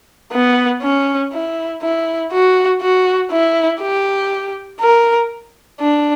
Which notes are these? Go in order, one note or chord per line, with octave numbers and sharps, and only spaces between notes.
B3
C#4
E4
E4
F#4
F#4
E4
G4
A#4
D4